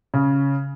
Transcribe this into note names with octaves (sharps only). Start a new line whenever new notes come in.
C#3